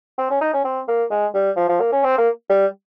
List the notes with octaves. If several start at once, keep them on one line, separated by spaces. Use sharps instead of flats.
C4
C#4
D#4
C#4
C4
A#3
G#3
G3
F3
F3
A#3
C#4
C4
A#3
G3